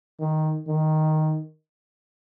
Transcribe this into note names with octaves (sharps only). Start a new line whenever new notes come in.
D#3
D#3